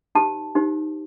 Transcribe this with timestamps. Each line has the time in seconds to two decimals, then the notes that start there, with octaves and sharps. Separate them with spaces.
0.15 D#4 G4 C5 A5
0.55 D#4 G4 C5